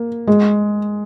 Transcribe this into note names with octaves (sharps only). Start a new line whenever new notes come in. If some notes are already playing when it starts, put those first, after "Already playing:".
Already playing: A#3
G#3